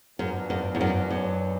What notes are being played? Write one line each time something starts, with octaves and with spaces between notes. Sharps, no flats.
F#2 A#2 F#3 B3 D4
F#2
E2
F#2
F#2